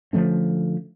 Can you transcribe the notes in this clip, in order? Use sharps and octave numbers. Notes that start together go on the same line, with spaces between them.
D3 F3 A3 C#4